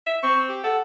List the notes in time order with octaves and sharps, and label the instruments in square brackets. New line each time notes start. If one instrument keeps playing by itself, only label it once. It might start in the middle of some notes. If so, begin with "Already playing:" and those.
[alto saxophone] E5
[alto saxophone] C4 [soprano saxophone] C#6
[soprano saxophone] G4
[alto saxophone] A4 [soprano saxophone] F#5